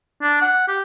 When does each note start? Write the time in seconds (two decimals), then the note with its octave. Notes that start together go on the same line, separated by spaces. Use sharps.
0.22 D4
0.42 F#5
0.68 G4